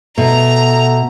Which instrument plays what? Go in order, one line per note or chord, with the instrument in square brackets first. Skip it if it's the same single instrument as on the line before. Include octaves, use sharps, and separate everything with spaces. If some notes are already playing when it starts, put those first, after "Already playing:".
[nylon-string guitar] B2 [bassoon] A3 [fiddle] A#5